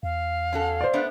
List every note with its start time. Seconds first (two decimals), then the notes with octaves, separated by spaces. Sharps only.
0.03 E2 F5
0.53 C#4 F#4 A4
0.81 C5 D5
0.93 A3 B3 D4